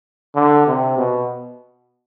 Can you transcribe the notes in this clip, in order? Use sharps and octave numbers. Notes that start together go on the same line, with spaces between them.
D3
C3
B2